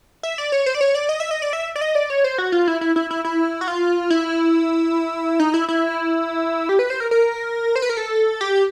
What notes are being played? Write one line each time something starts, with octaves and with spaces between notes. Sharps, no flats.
E5
D5
C#5
C5
D5
C#5
D5
D#5
E5
D#5
D5
E5
D5
D#5
D5
C#5
C5
F#4
F4
E4
E4
E4
E4
E4
F#4
F4
E4
D#4
E4
E4
G4
B4
C5
A#4
A#4
C5
B4
A#4
A4
G4